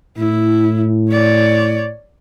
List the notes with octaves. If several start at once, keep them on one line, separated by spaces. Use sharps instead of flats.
A2 E4
C#5 D5